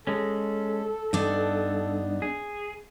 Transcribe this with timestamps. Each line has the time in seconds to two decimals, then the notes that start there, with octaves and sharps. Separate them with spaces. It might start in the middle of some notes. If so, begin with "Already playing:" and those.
0.07 G#3 C#4 A4
1.13 G2 B3 D4 D#4
2.22 G#4